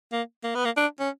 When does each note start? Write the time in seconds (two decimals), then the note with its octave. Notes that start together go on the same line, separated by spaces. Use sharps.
0.12 A#3
0.44 A#3
0.55 B3
0.65 A#3
0.77 D4
0.99 C#4